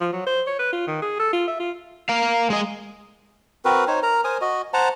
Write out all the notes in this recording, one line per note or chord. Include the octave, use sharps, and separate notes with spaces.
F3
F#3
C5
C#5
B4
F4
D#3
G#4
A4
F4
E5
F4
A#4 F5
G#3 D#5
C4 F#4 A#4 B4
D#4 C5 C#5
A#4 A#5
A#4 C5 G#5 D#6
F#4 D#5
C5 F#5 A5 A#5